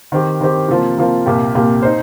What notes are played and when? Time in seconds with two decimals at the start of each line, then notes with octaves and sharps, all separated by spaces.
0.12 D#3 C4 G4
0.41 D#3 C4 G4
0.68 C3 F3 A#3 F4
0.98 C3 F3 A#3 F4
1.26 C2 A#2 A#3 G4
1.55 C2 A#2 A#3 G4
1.82 D#4 C5